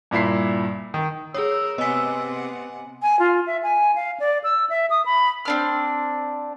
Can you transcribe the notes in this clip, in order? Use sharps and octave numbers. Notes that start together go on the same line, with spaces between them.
G2 A#2 E4 E5 C7
D#3
G#4 A#4 C#5 D#6 E6
C3 B3 D#5 F#5 G#5 B6
G#5
F4
E5
G#5
F5
D5
E6
E5
D#6
B5
C4 D4 F6